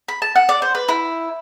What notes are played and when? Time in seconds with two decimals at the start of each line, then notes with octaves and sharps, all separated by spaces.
0.08 B5
0.22 A5
0.35 F#5
0.49 D5
0.62 C5
0.75 B4
0.89 E4